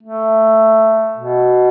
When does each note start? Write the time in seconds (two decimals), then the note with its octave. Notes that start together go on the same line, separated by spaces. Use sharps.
0.03 A3
1.17 B2